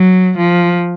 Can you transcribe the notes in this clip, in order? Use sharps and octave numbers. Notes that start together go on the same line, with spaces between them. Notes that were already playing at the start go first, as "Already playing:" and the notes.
Already playing: F#3
F3